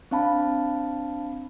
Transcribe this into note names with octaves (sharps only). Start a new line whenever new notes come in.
C4 D4 F5 A5 B5